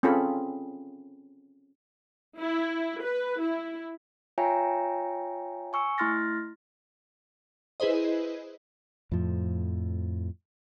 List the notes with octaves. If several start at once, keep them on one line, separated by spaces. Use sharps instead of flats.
C4 C#4 F4 G#4 A4 B5
E4
B4
E4
F4 C#5 E5 G5 G#5 A#5
G#5 C#6 E6 C#7
A3 E4 C6 F6 A6 A#6
E4 G#4 B4 C5 D#5
F2 A2 F3